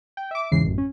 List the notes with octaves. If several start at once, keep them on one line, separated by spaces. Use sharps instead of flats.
G5
E5 D6
E2 G#2 C#3 E3 C7
A1 F#2
C#4